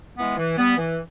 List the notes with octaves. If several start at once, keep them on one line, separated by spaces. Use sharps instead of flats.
E3 G#3 B3
E3
G3 B3
E3